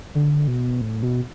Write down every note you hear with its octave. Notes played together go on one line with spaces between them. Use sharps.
D3
B2
A2
B2